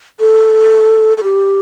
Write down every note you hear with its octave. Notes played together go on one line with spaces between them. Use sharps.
A4
A4
G4